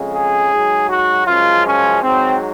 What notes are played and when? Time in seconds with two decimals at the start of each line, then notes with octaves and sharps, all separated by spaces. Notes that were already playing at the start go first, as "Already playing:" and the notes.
Already playing: F2 C#3 G#3
0.14 G#4
0.51 G#2 F#3
0.89 F#4
1.26 F#2 C#3 F3 G#3 F4
1.65 C#4
2.02 G#2 F#3 C4